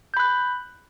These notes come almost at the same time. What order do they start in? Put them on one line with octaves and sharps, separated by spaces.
G6 B5 F#6